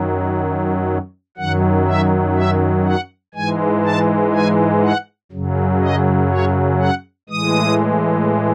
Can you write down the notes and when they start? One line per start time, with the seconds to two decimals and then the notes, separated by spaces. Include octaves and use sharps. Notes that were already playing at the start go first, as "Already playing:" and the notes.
Already playing: F#2 D#3 F#3
1.37 F#2 D#3 F#3 F#5
1.87 E5
2.36 E5
2.86 F#5
3.35 G#2 E3 G#3 G#5
3.84 A5
4.33 G#5
4.83 F#5
5.32 F#2 C#3 F#3
5.81 D#5
6.30 C#5
6.79 F#5
7.29 A2 E3 G#3 D#6